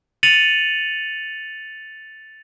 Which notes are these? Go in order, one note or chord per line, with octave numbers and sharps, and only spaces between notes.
A6 C#7 D#7 F7 F#7